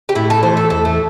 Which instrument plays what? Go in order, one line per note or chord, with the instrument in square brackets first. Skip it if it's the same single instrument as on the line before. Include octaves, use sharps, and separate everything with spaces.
[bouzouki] G4
[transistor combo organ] A2 [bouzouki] E4
[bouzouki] A4
[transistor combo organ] E3 A3 [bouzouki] C5
[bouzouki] A4
[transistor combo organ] E2 [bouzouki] A4
[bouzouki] A3